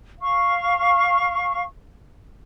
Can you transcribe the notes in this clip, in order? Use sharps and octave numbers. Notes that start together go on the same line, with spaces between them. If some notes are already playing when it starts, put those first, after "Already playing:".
F5 C#6